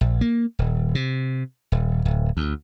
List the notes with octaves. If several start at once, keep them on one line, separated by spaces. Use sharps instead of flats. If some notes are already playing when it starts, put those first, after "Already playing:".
A#1
A#3
D#1
C3
D#1
D1
D2